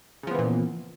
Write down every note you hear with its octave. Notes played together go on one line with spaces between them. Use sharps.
A#2 C#3 E3 F3 B3